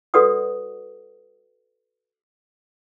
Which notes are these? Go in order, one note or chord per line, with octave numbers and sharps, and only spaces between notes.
F#4 A4 B4 D5 F#5 D#6